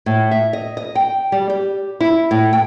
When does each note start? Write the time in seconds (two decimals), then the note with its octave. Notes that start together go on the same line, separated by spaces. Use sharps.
0.06 A2
0.31 E5
0.53 D#5
0.77 D#5
0.95 G5
1.32 G3
1.50 G4
2.00 E4
2.31 A2
2.53 G5